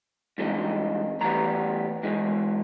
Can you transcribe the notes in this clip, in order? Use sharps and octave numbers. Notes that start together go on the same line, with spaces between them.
G2 E3 G#3 C4 D#4
A2 E3 G3 B3 A#5
G#2 E3 G#3